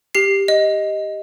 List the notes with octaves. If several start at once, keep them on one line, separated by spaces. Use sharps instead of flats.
G4 C7
D#5